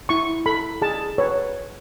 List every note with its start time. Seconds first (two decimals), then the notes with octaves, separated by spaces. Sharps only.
0.09 E4 C#6
0.46 A4 B5
0.82 G#4 A5
1.18 B4 C#5